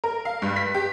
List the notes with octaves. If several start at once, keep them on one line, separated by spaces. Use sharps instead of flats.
A#4
F5
G2
B6
G4